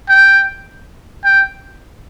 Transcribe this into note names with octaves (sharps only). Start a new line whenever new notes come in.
G5
G5